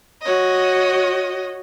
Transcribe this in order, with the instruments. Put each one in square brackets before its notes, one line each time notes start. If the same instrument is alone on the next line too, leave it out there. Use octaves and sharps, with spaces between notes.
[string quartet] F#4 C#5 D#5